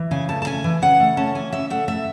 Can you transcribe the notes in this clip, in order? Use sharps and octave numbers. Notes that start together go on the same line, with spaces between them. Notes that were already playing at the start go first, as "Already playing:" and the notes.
Already playing: E3
C#3 G#5
A3 A5
A5
C#4 G#5
E3
C#3 F#5
A3
C#4 A5
E3 G#5
C#3 E5
A3 F#5
A3 E5